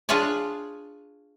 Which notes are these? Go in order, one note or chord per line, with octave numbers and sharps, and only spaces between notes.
D4 F4 G#4 C#5 D5